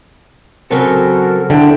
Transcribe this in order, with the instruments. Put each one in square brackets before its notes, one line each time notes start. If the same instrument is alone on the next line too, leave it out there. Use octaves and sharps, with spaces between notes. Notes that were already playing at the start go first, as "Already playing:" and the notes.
[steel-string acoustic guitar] C#3 C4 [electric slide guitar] F#3 F#4 A4 [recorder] A#4
[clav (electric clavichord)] D3 [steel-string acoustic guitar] E4 G5 [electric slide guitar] A4 D5